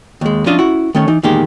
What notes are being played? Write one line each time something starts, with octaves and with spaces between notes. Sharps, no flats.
D#2 G#3
F3 C#4 D4 F4 D#5 E5
C#4 E4 F#4
D#3 A3 C#4 C#5
E3 D#4
E2 A#2 D#3 G#3 G4